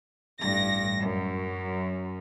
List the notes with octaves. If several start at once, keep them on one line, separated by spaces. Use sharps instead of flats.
A1 G2 A#6
F#2